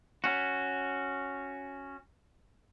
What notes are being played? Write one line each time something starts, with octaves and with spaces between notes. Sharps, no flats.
C#4 F#4